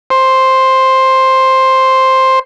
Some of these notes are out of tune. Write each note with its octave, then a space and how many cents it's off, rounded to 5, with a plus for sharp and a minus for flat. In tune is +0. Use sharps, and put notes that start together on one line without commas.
C5 +5